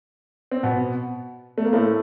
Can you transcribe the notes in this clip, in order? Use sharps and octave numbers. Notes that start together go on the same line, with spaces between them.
C4
B2 B3
A3
A#3
A2 A3